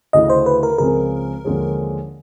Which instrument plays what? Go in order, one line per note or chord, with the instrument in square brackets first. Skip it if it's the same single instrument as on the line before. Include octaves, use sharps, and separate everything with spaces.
[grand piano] D2 C#3 E3 [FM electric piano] D#5
[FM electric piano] C5
B4
A#4
[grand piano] C#2 C#3 F3 G#3 C4 [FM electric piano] A#4
[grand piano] D#2 D3 F3 G#3 C#4